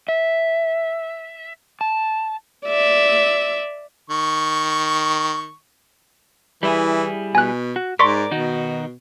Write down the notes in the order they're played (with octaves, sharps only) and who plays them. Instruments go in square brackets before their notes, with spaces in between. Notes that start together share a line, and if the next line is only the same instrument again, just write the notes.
[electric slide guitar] E5
A5
[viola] D5 E5
[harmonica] D#3 C#6
[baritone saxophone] E3 [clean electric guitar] G3 E4 G#4
[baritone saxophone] B2 [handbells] G#5 F#6
[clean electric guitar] F#4
[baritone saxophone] G#2 [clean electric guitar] A#4 D5 [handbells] C6 C#6 B6
[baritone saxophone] B2 [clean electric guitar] D#3 D#4 F#4